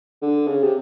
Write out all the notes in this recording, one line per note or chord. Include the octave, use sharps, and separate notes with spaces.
D3
C#3
C3